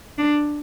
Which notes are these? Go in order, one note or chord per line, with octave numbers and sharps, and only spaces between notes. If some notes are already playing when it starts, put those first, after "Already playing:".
D4